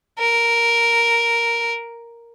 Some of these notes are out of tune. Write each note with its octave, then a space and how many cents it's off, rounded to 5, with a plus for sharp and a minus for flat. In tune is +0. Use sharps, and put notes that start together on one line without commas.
A#4 +0